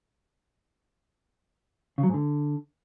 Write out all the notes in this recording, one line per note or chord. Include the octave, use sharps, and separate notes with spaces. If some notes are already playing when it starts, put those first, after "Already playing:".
C#3
F#3
G#2
D3